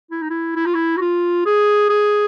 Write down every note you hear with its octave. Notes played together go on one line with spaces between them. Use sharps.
E4
D#4
E4
E4
F4
E4
F#4
F4
G#4
G#4